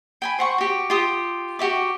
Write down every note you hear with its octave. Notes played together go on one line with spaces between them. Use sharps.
G5 G#5 B5
C5 F#5 C#6
F#4 G4
F4 G4 D#6
F#4 G4 E5 D6